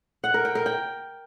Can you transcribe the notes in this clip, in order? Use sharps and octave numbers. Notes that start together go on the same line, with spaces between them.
F#5
A#4
G5
A#4
G5